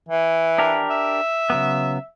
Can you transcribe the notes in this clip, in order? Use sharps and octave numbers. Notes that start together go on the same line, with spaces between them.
E3
D4 G4 A#4
E5
C#3 F#3 B3